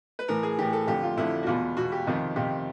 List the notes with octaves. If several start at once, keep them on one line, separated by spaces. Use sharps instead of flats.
B4
A2 E3 A#4
G#4
A2 E3 G4
A4
F2 D3 G4
F4
F2 D3 E4
F#4
E2 B2 F4
E2 B2 F#4
G4
F2 C3 D#3
F2 C3 D#3 G4